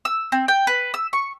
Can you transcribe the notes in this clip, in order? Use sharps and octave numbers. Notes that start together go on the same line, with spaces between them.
E6
C4
G5
B4
E6
C#6